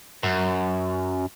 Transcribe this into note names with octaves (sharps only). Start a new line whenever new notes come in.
F#2